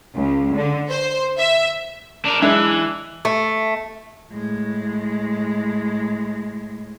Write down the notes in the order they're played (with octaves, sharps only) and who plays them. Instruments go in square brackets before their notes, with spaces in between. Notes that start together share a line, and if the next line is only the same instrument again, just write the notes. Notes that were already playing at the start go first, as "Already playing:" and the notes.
[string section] C#2
D3
C5
E5
[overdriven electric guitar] D4 A#4
[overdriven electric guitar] E3 [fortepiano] G#3 D4 E5
[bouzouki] A3
[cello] A2 G#3